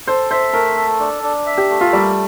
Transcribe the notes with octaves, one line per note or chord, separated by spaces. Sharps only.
A4 C5
C5 E5
A3 A#4
A4
D4
D4
E5
G4
A3
F4
G3 A#3